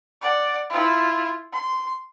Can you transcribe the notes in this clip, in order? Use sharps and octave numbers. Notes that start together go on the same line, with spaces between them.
D5 F#5
E4 F4
C6